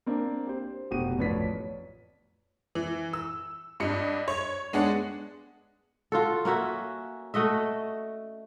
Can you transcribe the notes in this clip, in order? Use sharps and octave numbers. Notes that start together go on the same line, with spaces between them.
A#3 C4 D4
G4 C5
F1 B2 F#4 G4 D#7
A1 F2 B4 C#5 D5 B6
E3
E6
G2 D#5 C#7
C#5
G#3 B3 D4 G#4 F#5
F4 F#4 A4
A#3 C#4 F#4 E5
A3 F#4 D#5 E5